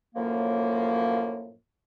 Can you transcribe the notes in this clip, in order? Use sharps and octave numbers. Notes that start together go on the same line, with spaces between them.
F#2 A2 F3 A#3